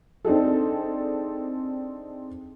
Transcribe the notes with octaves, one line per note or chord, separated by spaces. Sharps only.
C4 D4 D#4 G#4 A4